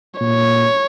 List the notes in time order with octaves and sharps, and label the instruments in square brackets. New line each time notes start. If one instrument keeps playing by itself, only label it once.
[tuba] A#2 [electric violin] C#5